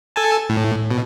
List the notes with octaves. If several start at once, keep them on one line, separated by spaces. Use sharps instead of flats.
A4 G#5 A5
A2
B2